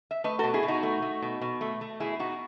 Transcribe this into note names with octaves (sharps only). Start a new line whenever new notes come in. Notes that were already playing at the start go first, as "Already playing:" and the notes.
E5
A3 B4 D#5
B2 F#4 A4
E4 G#4
B2
D#4 F#4
A3
A3
B2
B2
A3
A3
B2 E4 G#4
B2 D#4 F#4